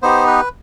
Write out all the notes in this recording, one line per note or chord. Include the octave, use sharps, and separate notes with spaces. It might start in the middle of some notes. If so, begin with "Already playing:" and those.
B3 D#4 G4 C5
B4